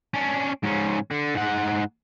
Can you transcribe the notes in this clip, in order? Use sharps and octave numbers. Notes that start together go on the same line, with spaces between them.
C#4 D4
G#2 C#4
D3
G#2 F#5